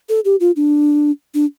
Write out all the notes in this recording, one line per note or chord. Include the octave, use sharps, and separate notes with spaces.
A4
G4
F4
D4
D4